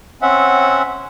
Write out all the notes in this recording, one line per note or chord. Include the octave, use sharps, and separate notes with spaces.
C4 C#4 E5 F#5